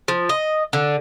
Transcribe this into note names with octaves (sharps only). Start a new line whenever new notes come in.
F3
D#5
D3